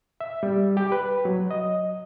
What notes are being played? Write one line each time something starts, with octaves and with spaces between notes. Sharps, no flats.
E5
G3
G4
B4
F#3
D#5